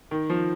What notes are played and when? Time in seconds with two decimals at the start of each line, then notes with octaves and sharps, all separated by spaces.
0.11 D#3
0.30 F3